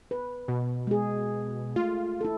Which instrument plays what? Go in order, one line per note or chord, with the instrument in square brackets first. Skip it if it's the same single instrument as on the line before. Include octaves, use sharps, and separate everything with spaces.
[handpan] B4
[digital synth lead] B2
[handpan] G#3 G#4
[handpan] A3 [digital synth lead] F4
[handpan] E4 A4